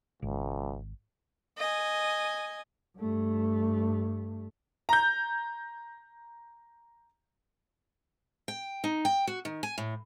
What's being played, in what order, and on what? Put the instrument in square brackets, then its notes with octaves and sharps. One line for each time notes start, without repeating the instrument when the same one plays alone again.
[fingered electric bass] G#1 [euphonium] C#2
[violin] D#5 G#5
[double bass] G2 A3
[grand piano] A#5 G6
[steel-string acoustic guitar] G5
D#4
G5
F#4
D#3
G#5
A2